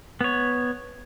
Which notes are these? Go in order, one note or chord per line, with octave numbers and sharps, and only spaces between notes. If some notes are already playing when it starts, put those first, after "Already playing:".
B3 C#5